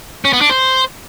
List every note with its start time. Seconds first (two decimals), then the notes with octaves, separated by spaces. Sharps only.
0.25 C#4
0.33 B3
0.41 D4
0.50 C5